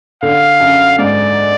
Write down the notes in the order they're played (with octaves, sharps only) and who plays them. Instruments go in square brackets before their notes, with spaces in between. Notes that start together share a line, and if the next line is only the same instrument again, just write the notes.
[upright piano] D3 [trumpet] F5
[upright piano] F#2
[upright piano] G#2 [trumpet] D5